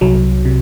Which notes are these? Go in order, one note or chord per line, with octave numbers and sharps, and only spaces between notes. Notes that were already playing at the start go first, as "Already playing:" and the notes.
C2 F#3
C3